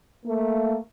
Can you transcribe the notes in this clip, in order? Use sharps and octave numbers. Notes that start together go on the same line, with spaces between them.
A3 A#3